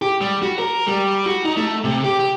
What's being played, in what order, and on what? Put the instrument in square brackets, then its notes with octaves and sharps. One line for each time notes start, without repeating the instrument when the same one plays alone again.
[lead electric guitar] G4
G3
F#4
A#4
G3
F#4
D#4
A3
C3
G4
G4